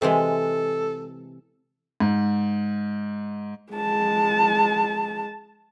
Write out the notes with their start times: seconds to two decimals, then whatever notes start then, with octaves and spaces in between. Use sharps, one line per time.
0.02 C3 E3 G#3 A4
2.00 G#2
3.72 G#3 A5